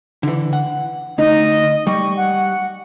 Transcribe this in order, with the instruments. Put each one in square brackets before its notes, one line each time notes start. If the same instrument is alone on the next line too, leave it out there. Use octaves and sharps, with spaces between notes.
[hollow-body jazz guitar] D3 E3
F#5
[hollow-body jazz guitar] D2 D#4 [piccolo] D#5
[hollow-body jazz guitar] G3 [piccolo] C#6
[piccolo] F#5